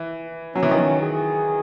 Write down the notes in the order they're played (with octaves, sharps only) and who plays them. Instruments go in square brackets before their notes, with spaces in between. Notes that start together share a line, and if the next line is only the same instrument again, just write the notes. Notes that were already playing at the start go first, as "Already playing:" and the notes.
Already playing: [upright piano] E3
[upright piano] F#3 [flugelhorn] C#4
[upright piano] E3
D#3
E3
[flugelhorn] G#4